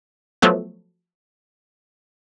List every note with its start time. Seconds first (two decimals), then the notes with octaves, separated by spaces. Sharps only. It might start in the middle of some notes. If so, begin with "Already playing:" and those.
0.42 F3 F#3 A3 B3